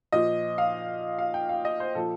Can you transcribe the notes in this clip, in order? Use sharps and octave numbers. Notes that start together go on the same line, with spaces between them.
A#2 F3 D#5
F5
F5
G5
F5
D#5
C5
A#2 F3 A4